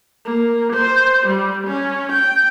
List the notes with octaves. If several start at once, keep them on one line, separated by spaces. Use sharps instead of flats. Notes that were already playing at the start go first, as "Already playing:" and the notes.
A#3
C5
G3
C#4
G5